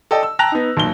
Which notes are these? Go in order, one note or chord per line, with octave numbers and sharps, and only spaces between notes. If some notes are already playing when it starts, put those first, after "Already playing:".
A4 D5 D#5 G5 A5
E6
G5 A5 A#5 F#6 A#6 F7
B3 D#4
B1 A#2 G7